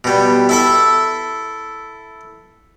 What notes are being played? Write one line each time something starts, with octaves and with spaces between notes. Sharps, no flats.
B2 G3
E4 A4 E5